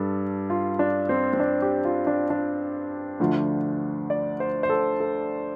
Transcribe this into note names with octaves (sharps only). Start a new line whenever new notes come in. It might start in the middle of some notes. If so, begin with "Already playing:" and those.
Already playing: G2 G3 A4
F4
D4
C4
C4
D4
G4
F4
D4
D4
D2 D3 F3
D5
C5
C5
A4
A4